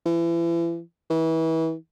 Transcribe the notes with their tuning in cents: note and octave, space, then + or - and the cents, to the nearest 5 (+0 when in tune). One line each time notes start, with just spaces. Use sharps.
E3 +35
E3 -30